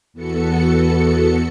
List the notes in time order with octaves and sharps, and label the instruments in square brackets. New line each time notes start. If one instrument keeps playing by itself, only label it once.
[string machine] E2 B3 F#4 A4 C#7